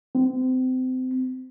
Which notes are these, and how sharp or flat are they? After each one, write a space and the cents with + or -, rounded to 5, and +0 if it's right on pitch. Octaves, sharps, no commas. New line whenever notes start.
C4 -30